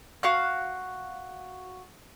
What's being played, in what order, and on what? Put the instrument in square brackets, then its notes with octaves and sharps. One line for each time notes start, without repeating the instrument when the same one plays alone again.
[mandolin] F#4 F5 F#6